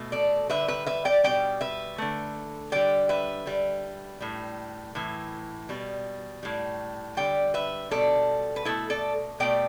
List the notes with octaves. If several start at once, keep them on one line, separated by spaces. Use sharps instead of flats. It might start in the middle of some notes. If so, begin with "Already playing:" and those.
Already playing: B2 A3
A4 D5
D3 G3 B4 E5
B4 E5
B4 E5
D5 G5
B2 G3 D5 G5
B4 E5
D3 A3
D3 G3 D5 G5
B4 E5
D3 G3
A2 G3
A2 E3
B2 G3
A2 G3
D3 G3 D5 G5
B4 E5
B2 G3 A4 D5
B4
B2 A3 E4 A4
A4 D5
B2 A3 D5 G5